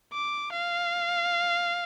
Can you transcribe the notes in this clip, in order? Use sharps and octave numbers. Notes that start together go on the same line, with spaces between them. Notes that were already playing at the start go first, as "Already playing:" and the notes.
D6
F5